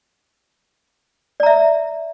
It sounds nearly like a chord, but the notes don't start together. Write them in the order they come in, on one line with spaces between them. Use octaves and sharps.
D5 A#5 E5